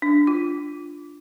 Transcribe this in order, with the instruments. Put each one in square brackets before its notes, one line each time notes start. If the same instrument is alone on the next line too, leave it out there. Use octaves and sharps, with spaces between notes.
[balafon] D4
F4